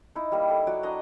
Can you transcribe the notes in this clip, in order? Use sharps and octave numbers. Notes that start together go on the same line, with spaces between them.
D#4 E4
G3 A#3
A4
F#3 F#4 D5
D4 E4 D#5 A#5